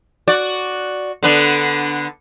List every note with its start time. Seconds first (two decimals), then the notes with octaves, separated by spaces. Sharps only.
0.28 F#4 D5
1.23 D3 B3 D4